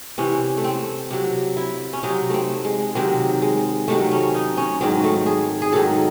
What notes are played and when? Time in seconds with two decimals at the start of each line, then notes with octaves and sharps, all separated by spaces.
0.18 C3 E3 C#4
0.57 A3
0.64 C4
1.10 C3 F#3
1.57 E4
1.93 C#4
2.03 C3 F#3 D#4
2.30 A3 C4
2.65 G#3
2.95 C3 D#3 F#3 C4
3.42 G#3
3.88 C3 D#3 F#3 A3
4.11 C#4
4.34 D#4
4.57 C#4
4.81 G#2 D#3 F#3 C4
5.04 A3
5.26 G#4
5.62 G#4
5.72 G#2 D#3 F#3 A4